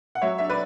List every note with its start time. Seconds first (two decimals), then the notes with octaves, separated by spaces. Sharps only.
0.15 F#5
0.22 F#3 C#5 E5
0.38 D4 E5
0.50 B4 D5